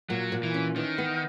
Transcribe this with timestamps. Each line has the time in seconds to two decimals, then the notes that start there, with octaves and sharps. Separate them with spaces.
0.10 A#2 F#3
0.32 A#2
0.43 E3
0.54 C#4
0.76 D#3 E3
0.98 B3